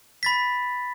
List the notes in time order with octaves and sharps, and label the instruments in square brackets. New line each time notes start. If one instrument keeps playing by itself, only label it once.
[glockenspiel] B5 A6 B6